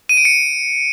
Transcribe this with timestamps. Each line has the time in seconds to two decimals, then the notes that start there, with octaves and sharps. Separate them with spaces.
0.09 D#7
0.17 D7
0.25 C#7